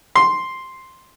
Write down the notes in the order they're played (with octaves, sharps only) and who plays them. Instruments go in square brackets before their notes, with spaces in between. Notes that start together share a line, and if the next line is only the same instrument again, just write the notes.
[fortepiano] C6